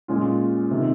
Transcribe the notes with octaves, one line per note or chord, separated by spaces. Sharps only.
A#2 G#3 C#4 F4
C3 D#3